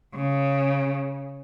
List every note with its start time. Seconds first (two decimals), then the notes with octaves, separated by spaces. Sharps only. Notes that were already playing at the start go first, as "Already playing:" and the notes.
0.15 C#3